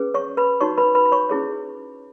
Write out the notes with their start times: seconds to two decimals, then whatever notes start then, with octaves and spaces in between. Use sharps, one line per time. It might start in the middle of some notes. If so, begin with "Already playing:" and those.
Already playing: C#4 G#4 B4
0.14 C#5 C#6
0.37 B4 B5
0.60 D#4 F#4 C#5 C#6
0.78 B4 B5
0.95 B4 B5
1.05 B5
1.12 C#5 C#6
1.29 C#4 E4 G#4 C#5